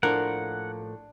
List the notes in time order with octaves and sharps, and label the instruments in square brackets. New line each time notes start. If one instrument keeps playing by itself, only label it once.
[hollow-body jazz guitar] A2 F3 A#3 [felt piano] D4 [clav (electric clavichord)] A#4 [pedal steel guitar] F#5